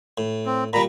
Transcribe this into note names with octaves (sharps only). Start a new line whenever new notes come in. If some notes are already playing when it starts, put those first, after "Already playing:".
A2
C4
A#2 G3 A#5 B5